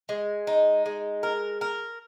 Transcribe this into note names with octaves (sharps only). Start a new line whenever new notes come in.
G#3
D#4
G#3
A#4
A#4